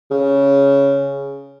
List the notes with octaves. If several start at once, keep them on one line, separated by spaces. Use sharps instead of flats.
C#3